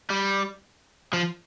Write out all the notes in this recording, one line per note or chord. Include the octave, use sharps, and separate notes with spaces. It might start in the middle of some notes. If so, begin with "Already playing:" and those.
G3
F3